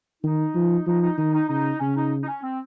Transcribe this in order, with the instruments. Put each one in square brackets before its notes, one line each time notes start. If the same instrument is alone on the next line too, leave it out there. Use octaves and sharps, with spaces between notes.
[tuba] D#3 [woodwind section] D#4
[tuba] F3
[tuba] F3 [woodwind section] D#4
[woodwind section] D#4
[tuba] D#3 [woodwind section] D#4
[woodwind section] D#4
[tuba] C#3 [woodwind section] D#4
[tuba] C#3 [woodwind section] C#4
[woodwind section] D#4
D#4
C#4
C4